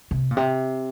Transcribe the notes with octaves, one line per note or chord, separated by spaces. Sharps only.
C3
A#2
C3